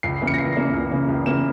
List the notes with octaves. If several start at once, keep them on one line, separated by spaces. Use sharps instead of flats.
C#2 C7
C#3 E3 A#3
C#7
A#6
C#2 C7
C#3 E3 A#3
C#2
C#3 E3 A#3
C#2
C#3 E3 A#3 E7